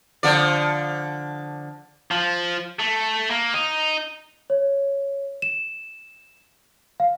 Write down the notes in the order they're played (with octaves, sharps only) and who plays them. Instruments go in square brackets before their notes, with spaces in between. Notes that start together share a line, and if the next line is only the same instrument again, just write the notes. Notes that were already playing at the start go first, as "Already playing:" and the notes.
[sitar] D3 F3 D5
[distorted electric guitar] F3
A3
A#3
D#4
[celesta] C#5
E7
F5